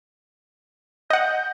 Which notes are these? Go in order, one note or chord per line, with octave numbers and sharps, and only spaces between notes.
D#5 F#5 G6